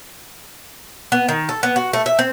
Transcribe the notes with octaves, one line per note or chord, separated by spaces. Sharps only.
B3
D#3
A4
B3
F#4
A3
E5
C4